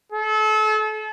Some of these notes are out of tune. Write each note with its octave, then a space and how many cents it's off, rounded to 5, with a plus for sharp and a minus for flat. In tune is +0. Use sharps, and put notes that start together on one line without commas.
A4 -35